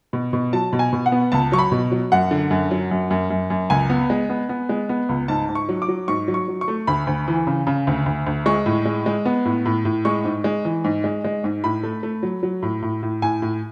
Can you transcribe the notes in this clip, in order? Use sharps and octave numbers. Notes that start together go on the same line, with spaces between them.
B2
B2
F#3 A5
B2
G#5
B2
F#5
B3
C#2 A5
F#3 C#6
B5
B2
F#3
F#2 F#5
D3
F#2
F#3
F#2
F#2
F#2
F#2
C#2 G#5
B3
G#3
B3
B3
G#3
B3
C#2
G#2 A5
G#2
C#6
F#3
D6
F#3
G#2 C#6
F#3
C#6
F#3
C#6
A3
D2 B5
D2
E3
C#3
C#3
D2
D2
D2
G#3 C#6
A2
G#3
G#3
B3
A2
A2
A2
G#3 C#6
G#2
G#3
E3
G#2
G#3
G#3
G#2
A2 B5
A3
A3
F#3
F#3
A2
A2
A2
A2 G#5
A2